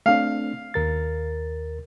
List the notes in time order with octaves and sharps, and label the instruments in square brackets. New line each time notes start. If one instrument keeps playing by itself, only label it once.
[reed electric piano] A3 C4 D4 [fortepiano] F5
[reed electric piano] D#2 A#4 A6